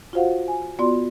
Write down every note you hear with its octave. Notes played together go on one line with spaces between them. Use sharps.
F4 F#4 C5 F5 F#5
G#5
B3 F4 F#4 D5 C6